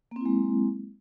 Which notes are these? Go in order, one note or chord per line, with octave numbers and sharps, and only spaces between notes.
F#3 G#3 A#3 C4 E4